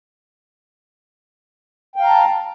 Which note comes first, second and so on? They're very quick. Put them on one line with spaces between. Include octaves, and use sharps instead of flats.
G5 F5 A#5 A5